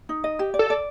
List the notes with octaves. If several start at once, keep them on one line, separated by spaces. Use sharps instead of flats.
D#4
D#5
G4
D5
A4
D5